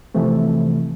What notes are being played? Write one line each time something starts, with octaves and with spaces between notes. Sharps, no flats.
C3 E3 F3 A3